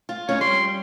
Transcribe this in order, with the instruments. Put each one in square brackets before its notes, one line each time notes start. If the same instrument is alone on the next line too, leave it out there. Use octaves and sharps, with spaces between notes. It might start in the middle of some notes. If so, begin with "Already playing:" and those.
[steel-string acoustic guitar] F4
[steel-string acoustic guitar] C#4 D#4 [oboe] C#5
[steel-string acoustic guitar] G3 [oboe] C6